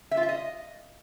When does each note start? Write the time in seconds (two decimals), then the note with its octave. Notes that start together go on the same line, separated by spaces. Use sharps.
0.11 E5
0.17 F4
0.23 E5
0.29 D#5